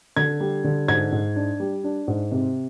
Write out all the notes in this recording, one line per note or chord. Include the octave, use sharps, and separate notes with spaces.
D3 G#6
G3
D3
G#2 G#6
G#2
D4
G3
D4
G#2
C3